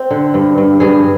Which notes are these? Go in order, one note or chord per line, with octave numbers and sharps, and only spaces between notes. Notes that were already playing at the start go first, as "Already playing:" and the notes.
Already playing: C4 C5
D3
G2
G2
G2 G#4